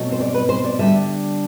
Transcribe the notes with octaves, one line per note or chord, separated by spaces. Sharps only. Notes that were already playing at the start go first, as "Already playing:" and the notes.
Already playing: B2 F#3 A3 C4
C5
D5
B4
C5
D5
D3 G3 D4 E5